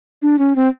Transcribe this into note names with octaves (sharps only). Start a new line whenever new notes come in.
D4
C#4
C4